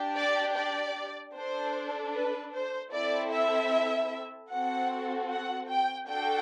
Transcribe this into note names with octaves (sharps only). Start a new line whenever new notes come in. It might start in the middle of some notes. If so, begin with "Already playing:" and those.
Already playing: D4 G4
D5
D5
D4 A4 C5
B4
C5
C4 E4 A4 D5
E5
C4 F#4 A4 F#5
F#5
G5
D4 F#4 A4 G5